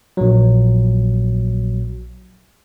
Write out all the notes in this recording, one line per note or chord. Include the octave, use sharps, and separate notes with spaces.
A#1 F#3